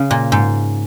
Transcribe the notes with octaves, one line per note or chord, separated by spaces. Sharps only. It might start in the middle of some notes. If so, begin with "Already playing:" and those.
Already playing: C#3
A#2
G#2